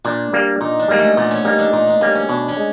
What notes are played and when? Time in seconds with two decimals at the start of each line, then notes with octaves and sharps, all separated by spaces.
0.04 A#2 D4
0.33 G3 A#3
0.61 A#2 D#4
0.79 D4
0.88 G3 G#3 A#3
0.98 A3
1.17 A#2 B3
1.31 C#4
1.45 G3 A#3 D#4
1.59 D4
1.73 A#2 D#4
1.87 D4
2.01 G3 A#3 C#4
2.15 C#4
2.29 B2 D4
2.48 C#4
2.57 G#3